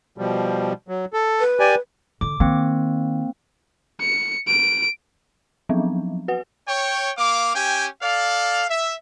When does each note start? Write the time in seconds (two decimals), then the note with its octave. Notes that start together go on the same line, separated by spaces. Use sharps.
0.18 B2 F3 G3
0.88 F#3
1.13 A4
1.40 B4
1.60 G4 D5 G#5
2.21 D3 D6
2.40 D#3 A#3 C4
4.00 C#7
4.48 D7
5.69 F3 F#3 B3 C4
6.28 F#4 B4 F#5
6.67 C#5 G5
7.18 A#3 F5 D6
7.55 C#4 G4 G5 G#5
8.03 A4 D5 F5
8.71 E5